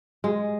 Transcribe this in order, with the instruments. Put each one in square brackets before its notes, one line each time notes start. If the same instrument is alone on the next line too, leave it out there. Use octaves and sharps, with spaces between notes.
[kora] G#3